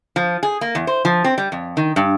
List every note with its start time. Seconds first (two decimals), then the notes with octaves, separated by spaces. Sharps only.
0.16 F3
0.43 G#4
0.61 A#3
0.75 E2
0.87 C5
1.05 F3
1.24 C4
1.38 G3
1.52 F2
1.77 D#3
1.96 G2